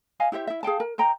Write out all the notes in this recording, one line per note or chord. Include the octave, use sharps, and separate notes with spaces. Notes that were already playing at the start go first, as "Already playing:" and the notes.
D#5 F5 G#5
E4 G4 C5 E5
E4 E5
G#4 F5 G5 A5
A#4
C5 D#5 G5 A#5